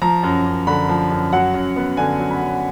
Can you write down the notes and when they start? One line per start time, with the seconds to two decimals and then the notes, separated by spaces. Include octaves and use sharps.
0.01 F3 A#5
0.23 F#2
0.45 F#2
0.67 D3 B5
0.89 F3
1.11 F#2
1.33 F#3 F#5
1.54 F#2
1.76 B3
1.97 D3 G#5
2.19 F#3
2.31 B5
2.41 F#2